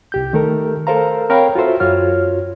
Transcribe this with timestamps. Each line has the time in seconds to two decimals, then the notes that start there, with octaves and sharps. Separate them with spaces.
0.12 C2 G4 G6
0.33 D#3 A3 A4 A#4
0.87 A4 A#4 C5 F5 A#5
1.30 C4 A#4 C#5 F5 G5 B5
1.55 F4 F#4 A4 C5 E5
1.80 F#2 F4 F#4 C#5 F6